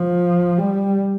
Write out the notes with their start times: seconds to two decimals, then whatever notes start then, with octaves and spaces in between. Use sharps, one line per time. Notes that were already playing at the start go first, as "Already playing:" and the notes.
Already playing: F3
0.58 G3